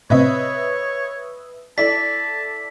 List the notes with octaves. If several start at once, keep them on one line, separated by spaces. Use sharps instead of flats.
A2 C3 C4 B4 C#5 D#5 E5
E4 A4 D5 A5 B6